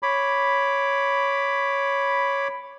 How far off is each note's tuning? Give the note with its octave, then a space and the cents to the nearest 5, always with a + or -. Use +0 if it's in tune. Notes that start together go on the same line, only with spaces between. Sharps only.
C#5 +0 B5 +5 D6 +0